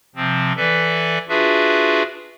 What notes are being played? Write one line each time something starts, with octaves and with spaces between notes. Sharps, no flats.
C3 F3 C4
E3 A4 B4 D5 E5
D4 F4 F#4 G#4 B4 E5